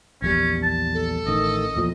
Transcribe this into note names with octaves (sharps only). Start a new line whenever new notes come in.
A#1 E2 G3 C#4
A5
A4
A1 D#3 D#5
E2 A#2 F3